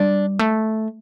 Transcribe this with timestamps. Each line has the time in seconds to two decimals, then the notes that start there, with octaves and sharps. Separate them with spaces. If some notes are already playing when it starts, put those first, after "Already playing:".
Already playing: G3 D4
0.39 A3